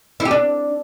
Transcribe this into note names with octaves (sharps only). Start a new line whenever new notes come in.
E4
G4
D4